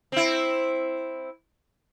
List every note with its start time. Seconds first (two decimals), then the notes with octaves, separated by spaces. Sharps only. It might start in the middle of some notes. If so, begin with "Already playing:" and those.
0.12 C4 E4